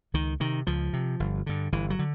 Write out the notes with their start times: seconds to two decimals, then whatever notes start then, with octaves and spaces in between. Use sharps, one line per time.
0.14 C#2 D#3
0.40 C3 D#3
0.67 C#2 F3
0.93 C3
1.20 G1
1.46 G2 D3
1.72 G1 E3
1.90 F#3
1.99 D3